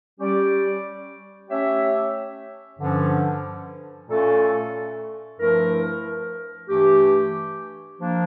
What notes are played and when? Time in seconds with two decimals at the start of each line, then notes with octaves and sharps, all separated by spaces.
0.19 G3 C#4 G4 D5
1.49 A3 C#4 G4 C#5 E5
2.78 G2 D3 F3 C#4
4.09 A#2 A3 C#4 F4 A4
5.38 G2 F3 A3 E4 A#4
6.69 G2 E3 A3 D4 G4
7.98 F3 A#3 D4